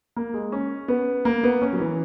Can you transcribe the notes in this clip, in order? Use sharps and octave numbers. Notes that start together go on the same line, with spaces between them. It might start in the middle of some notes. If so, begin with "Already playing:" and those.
A#3
G#3
C#4
B3
A#3
B3
C#4
F#3
E3